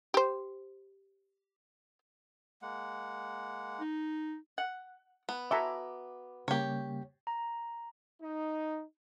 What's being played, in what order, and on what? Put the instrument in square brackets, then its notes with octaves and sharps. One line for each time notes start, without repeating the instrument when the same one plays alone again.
[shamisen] G4 C5
[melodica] G#3 A#3 F#5
[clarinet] D#4
[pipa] F#5
[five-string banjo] B3
[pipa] F#4 A4 C6 [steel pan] E5 G#5 A#5 [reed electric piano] D6
[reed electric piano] C#3 G3 A#3 [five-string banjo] G4 C#5
[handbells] A#5
[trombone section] D#4